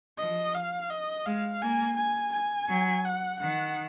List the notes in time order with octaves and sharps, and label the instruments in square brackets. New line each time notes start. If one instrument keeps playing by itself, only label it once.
[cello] F3 [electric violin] D#5
[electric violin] F5
D#5
[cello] G#3 [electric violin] F5
[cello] A#3 [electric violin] G#5
[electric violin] G#5
G#5
[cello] F#3
[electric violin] F#5
[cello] D#3 [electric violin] F#5